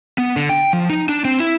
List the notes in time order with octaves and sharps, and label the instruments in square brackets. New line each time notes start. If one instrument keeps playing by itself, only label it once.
[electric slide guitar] B3
D3
G5
F3
D#4
D4
C4
E4